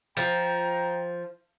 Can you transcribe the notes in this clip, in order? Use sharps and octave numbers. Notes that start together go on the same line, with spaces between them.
F3 G5 A#5